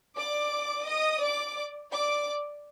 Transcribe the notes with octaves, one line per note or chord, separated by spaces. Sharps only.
D5 D6
D#5 D#6
D5 D6
D5 D6